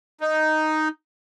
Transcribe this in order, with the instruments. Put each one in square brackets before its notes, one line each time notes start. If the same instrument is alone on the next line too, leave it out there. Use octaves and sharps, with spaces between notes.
[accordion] D#4